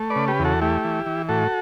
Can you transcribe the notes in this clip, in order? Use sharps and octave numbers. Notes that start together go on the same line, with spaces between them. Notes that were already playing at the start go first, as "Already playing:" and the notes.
Already playing: A3
B4 D5
C#3
G4 B4
E2
F#4 A4
A3 E4 G4
E3
E3
A2 F#4 A4